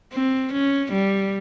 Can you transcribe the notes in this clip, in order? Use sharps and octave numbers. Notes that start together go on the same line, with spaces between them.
C4
C#4
G3